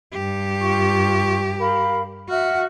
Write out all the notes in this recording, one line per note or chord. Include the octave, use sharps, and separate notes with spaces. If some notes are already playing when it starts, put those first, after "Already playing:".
G2 G4
F4 C#6
A#4 F5 B5
F#4 E5 F#5 F6